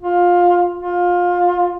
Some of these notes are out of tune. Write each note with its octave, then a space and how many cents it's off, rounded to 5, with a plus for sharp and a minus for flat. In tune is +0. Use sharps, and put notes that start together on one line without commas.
F4 +15
F4 +20